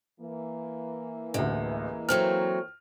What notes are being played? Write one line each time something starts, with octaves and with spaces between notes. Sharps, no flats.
E3 A#3
A1 D2 G#3
F#3 A3 C4 F6